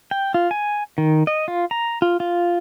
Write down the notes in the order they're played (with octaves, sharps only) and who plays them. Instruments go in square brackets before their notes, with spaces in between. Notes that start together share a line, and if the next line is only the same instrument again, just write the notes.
[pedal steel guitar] G5
F4
G#5
D#3
D#5
F4
A#5
F4
F4